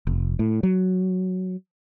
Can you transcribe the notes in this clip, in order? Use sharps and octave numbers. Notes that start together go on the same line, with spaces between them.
F1
A2
F#3